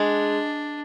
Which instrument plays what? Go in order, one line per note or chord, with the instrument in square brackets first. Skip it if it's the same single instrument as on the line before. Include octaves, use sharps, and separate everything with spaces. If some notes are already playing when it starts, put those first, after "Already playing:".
Already playing: [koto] G#3 [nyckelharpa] D4